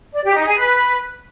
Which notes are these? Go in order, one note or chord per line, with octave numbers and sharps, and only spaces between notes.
D5
G4
D#4
G#4
B4